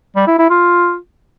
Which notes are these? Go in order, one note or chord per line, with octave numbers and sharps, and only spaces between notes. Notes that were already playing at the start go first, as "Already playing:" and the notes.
G3
E4
E4
F4